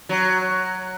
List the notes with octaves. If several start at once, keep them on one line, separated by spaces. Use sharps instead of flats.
F#3